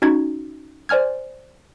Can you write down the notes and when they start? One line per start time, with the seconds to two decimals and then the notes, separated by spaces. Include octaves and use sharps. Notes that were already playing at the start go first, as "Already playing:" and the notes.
0.02 C#4 D#4 F#4 G#6
0.89 C5 D5 G#5 F6 G#6